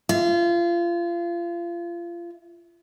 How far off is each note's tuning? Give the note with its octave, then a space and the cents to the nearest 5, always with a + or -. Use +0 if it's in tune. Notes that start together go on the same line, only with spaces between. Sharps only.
F4 -30